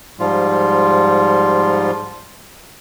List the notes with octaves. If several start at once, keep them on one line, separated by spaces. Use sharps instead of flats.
G#2 F3 G3 F4